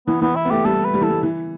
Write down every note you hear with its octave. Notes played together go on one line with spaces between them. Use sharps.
E3 B3
E3 B3
E4
B3
A3 G4
G3 A4
B4
G3
E3 A4
G3
E3